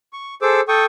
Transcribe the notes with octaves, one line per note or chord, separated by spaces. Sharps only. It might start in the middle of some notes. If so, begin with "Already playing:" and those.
C#6
G#4 A4 C5 D6 E6
A4 G5 C#6 D#6